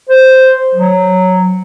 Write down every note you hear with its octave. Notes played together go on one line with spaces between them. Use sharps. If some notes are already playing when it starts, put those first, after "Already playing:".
C5
F#3